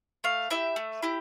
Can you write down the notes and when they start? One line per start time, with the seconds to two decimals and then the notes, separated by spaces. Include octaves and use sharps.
0.24 A3 F5
0.50 E4 G4 E5
0.76 A3
1.03 E4 G4